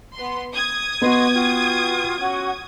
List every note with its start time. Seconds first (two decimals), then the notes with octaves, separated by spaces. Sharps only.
0.14 B3 C6
0.54 D#6 G#6
1.02 B3 F#4 D#5 C6
1.34 F4 F#4 G5
2.18 C#4 F#4 F#5